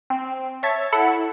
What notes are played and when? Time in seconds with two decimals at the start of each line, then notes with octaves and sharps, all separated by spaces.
0.10 C4
0.63 C#5 E5 A5
0.92 E4 A4 F#5